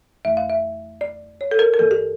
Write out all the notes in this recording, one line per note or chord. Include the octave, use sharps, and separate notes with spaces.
F2 E3 A3 E5
F5
E5
D5
C#5
A4
A#4
A#4
G2 E3 A#3 A4
G4